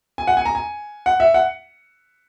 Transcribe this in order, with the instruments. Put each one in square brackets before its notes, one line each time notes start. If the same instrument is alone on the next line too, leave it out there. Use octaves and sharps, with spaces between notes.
[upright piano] G#5
F#5
G#5
A#5
G#5
F#5
E5
F#5